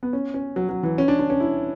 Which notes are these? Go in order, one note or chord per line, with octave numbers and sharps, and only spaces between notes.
B3
C#4
C#4
F#3
F#3
E3
C#4
D4
D4
C#4
E4